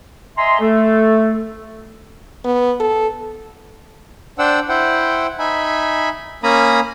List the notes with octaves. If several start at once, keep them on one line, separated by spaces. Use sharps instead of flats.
D#5 E5 G#5 A#5 C6
A3 A4
B3
A4
D4 C5 F#5 G5 E6
E4 C5 F#5 G5
D#4 E5 G#5 B5
A#3 C#4 G#5 A#5 B5 D#6